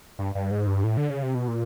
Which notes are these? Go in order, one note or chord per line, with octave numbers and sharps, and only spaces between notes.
G2
G2
G#2
G2
A2
D3
C#3
C3
B2
A#2